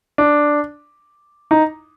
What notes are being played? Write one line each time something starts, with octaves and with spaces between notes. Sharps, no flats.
D4
D#4